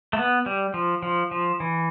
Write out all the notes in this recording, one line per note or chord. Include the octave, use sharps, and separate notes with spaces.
A3
B3
G3
F3
F3
F3
E3